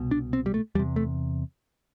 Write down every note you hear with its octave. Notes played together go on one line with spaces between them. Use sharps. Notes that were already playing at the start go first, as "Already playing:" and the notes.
Already playing: C2 B2
D4
C4
G3
A3
E2 C3 G3
A3